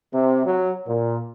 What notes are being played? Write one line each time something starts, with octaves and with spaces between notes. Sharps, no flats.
C3
F#3
A#2